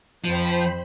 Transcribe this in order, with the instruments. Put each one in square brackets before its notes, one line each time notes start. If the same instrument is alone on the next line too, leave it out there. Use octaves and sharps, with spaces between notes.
[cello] F2 [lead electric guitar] F3 [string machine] C5 G5 B5